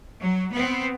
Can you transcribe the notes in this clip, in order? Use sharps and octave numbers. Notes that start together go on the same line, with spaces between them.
F#3
B3 C4